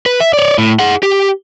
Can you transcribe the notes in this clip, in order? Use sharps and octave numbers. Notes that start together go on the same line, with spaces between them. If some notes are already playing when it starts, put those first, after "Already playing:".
B4
E5
C#5 D5
A2
G#4 F#5
G4